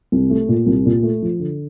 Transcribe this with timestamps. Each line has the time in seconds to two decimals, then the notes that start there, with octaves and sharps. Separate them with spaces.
0.12 C2
0.30 A3
0.49 A#2
0.66 C2
0.86 A#2
1.03 A3
1.22 F3
1.40 D3